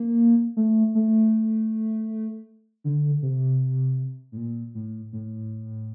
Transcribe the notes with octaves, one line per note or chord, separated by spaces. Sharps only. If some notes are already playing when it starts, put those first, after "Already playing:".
Already playing: A#3
A3
A3
D3
C3
A2
A#2
A2
A2